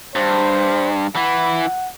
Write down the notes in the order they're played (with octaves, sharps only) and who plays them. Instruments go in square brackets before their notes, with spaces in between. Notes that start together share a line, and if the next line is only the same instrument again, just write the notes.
[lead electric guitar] G2 [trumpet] C5
[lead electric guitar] E3 E4 [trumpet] F#5